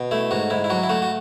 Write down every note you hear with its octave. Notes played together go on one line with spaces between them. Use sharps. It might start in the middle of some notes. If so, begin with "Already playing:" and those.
Already playing: B2
A3 E4
G#2 F#4
G#2 E4
E4
F#3 F#4
E4
A3 F#4
F#4